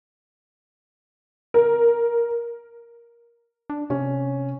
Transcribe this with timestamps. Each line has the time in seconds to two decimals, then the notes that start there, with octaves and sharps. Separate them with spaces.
1.54 A#4
3.70 D4
3.90 C3 C#4